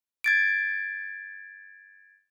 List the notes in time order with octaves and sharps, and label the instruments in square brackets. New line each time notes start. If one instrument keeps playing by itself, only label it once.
[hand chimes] G#6 A6 D7